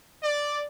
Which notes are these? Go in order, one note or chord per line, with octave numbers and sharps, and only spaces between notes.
D5